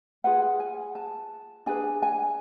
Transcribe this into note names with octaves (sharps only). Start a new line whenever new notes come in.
F4 G#4 B4 F#5
F#5
G#5
A5
D4 G#4 B4 G#5
G#5